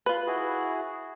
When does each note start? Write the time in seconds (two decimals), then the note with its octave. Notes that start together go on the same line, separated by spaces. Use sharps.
0.06 F4 B4
0.27 E4 F#4 G#4